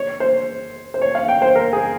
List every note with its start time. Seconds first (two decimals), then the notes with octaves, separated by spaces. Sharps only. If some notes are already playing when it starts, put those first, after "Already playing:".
Already playing: C#5
0.20 C5
0.94 C5
1.02 C#5
1.15 F5
1.28 G5
1.42 C5
1.55 A#4
1.73 G#4